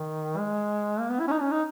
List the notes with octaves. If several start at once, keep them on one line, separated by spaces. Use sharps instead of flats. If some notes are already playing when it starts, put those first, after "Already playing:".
Already playing: D#3
G#3
A#3
B3
E4
C#4
D#4
C#4
D#4